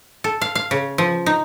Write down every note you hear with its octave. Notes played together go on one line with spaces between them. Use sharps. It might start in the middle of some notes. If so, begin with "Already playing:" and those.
A4
F5
F5
C#3
F3
D#4